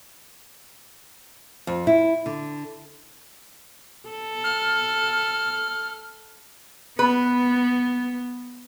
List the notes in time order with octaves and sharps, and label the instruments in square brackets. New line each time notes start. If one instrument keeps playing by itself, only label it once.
[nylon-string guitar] F2
E4
D3
[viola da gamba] A4
[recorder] F6
[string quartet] B3 [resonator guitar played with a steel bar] B4